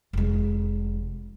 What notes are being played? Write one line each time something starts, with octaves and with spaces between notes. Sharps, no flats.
F1 G#3